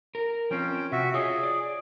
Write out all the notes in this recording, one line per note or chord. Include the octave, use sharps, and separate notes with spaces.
A#4
F3 C4 C#4 G5
C3 F#4 E5
F4 G#4 C#5 D#5
D5